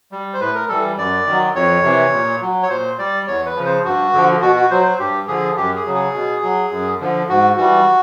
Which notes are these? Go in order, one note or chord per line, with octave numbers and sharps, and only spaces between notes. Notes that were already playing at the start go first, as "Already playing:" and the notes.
G3
C5
A2 B4
A#4
E3 G3 A4
F#2 D5
D#3 F#3
F2 C#5
C3 E3
A#2
F#3
C#5
A#2 C5
G3 D5
E2 C#5
B4
C#3 F3
C5
G2 F#4
D3 F3
B2 F#4
F#4
F#3 C5
C5
G2 G4
D3 F3 G#4
F#2 G4
G#4
C#3 F#3
G#4
B2
F#3
F#2
D3 F3
G#2 F#4
E3 G3 F#4